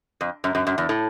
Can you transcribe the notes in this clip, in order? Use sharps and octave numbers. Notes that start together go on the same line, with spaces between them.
F2
F#2
F#2
F#2
E2
A2